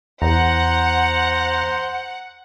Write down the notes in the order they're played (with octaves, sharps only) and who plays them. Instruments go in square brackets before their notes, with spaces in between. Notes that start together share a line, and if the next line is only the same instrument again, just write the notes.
[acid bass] E2 [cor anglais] C5 [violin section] F#5 [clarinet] A#5